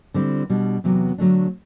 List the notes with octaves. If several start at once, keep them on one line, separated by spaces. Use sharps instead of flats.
D3 G3 C4 E4
B2 G3 D4
E2 C3 F#3 B3
D3 F#3 A3 D4